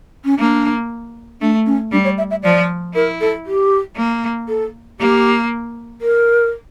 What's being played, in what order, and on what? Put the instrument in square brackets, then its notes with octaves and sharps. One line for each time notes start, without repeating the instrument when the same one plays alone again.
[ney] C#4
[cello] A#3 [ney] D4
[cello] A3 [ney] D4
[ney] C#4
[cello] G3 [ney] D4
[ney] C#5
E5
E5
[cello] F3 [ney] D5
[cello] E4 [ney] A#4
[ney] A4
G4
[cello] A#3
[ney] A4
[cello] A#3 [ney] G4
[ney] A#4